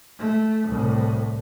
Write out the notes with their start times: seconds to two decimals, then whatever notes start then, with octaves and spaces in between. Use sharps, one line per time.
0.19 A3
0.68 C2 A2